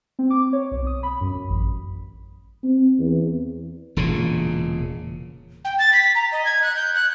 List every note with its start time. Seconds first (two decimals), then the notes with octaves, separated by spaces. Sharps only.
0.19 C4
0.30 D6
0.53 C#5
0.71 B1
0.87 D#6
1.03 B5
1.21 F#2
1.35 F#2
1.49 A1
2.63 C4
2.99 E2
3.97 E1 A#2 C#3
5.65 G5
5.79 A6
5.93 B6
6.15 A#5
6.32 D#5
6.45 G#6
6.63 F#6
6.76 G6
6.95 F#6